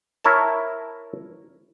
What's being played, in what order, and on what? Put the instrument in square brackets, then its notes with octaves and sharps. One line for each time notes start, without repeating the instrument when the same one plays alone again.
[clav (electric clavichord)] E4 A#4 C#5 A5